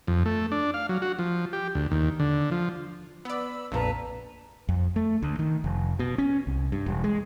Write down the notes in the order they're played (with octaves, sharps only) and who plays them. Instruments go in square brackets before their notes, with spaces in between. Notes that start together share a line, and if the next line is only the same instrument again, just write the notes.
[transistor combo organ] F2
A3
D4
F5
F#3
F#4
F3
G4
D2
D#2
D3
F3
[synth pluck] B3 D5 [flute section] B5 E6
[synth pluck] A#1 F2 A#2 [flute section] B4 A5 A#5
[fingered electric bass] F2
A3
D2
D#3
F1
B2
C#4
C2
G2
E1
G#3